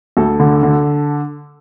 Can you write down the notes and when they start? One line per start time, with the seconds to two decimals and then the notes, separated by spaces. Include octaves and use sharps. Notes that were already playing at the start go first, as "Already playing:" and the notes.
0.17 D2 A4
0.40 D3
0.63 D3